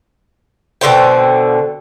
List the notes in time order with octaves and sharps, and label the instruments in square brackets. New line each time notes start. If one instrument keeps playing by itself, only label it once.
[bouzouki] B2 D3 C5 G5